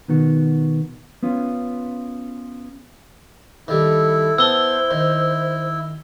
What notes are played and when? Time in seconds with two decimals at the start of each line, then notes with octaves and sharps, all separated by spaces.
0.08 B2 D#3 B3 F#4
1.23 B3 C#4 F4
3.68 D#3 G3 E4 A4
4.38 B3 C5 A5 E6 G7
4.91 D#3